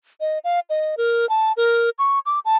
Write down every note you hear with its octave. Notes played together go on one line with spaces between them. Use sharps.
D#5
F5
D#5
A#4
A5
A#4
C#6
D6
A5